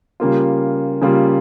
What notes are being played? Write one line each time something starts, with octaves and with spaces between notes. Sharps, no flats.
C#3 G3 A#3 F4
C#3 G3 A#3 F4